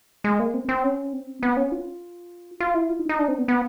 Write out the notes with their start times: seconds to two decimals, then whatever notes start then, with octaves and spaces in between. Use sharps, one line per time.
0.24 G#3
0.39 A#3
0.54 C4
0.69 C4
0.84 C#4
1.13 C4
1.43 B3
1.57 C#4
1.72 F4
2.60 F4
2.74 E4
2.89 F4
2.99 D#4
3.09 D#4
3.19 D4
3.28 C4
3.38 B3
3.48 B3